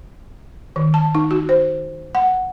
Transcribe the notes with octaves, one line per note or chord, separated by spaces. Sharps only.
D#3
A5
D#4
F#4
C5
F#5